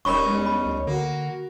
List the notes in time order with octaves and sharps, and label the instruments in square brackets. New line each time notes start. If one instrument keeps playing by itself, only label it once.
[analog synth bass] D#1 [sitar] G2 C#4 D#4 [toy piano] A#4 B5 C#6
[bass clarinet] E2 [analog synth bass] G#3
[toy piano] B5
[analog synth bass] D2
[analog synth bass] D3 [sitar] A#3 [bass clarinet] F#4